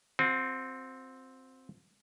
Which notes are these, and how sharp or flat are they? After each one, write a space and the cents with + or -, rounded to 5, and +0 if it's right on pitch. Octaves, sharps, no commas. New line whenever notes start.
C4 +0 F#4 -45